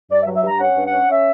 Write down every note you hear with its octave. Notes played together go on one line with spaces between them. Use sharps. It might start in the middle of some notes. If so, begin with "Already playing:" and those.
G2 D5
E5
F#3
E5
G2 A#5
C#4 F#5
G2
F#5
C#4
C#4 E5